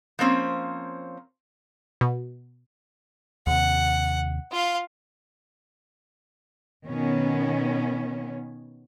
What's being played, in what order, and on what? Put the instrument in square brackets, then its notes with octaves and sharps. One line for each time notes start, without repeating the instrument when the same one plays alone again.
[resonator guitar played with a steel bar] F3 A#3 C4 C#4
[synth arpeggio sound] B2
[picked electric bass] D#2 C3 [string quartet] F#5
[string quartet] F4 F5
[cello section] B2 D#3 B3 C#4